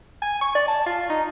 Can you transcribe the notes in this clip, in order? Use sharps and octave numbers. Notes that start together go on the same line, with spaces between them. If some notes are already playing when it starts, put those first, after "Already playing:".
G#5
C#6
D5
A5
F4
D#4